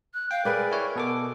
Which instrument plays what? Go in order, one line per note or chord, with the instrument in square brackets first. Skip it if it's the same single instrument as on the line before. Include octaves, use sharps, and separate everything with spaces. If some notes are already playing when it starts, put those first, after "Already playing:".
[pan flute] F#6
[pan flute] F5 [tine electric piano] G5
[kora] G#4 B4 D5 [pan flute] A#4
[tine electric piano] E4 C#5
B2 A4 D6